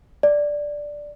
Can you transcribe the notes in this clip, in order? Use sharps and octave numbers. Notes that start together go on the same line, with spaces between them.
D5